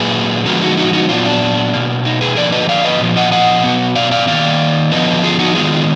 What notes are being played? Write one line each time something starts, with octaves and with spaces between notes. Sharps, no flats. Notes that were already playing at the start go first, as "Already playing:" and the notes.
Already playing: A#2 F#3 A#3 G#4 B4
D3 F3 G#3 B3 F#4 A#4
D#4 F#4
D#4 F#4
D#4 F#4
A#2 F#3 B3 D4 F4
D4
B2 A#3
D#4
G#4 B4
D3 F3 A#3 A#4 D5
B4 D#5
D5 F5
B4 D#5
A#2 F3 B3
D#5 F#5
D#5 F#5
B2 F#3 B3
D5 F5
D5 F5
D#3 A#3 D5 F5
D3 F3 B3 B4 D#5
F4 G#4
D#4 F#4
D#3 G#3 B3 F4 G#4